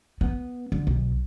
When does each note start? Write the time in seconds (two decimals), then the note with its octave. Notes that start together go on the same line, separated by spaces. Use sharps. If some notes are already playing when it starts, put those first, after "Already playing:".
0.21 B3
0.72 D3
0.87 B1